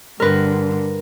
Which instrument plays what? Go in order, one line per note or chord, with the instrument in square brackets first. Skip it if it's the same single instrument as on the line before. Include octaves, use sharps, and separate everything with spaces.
[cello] G2 D3 [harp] A#4 B4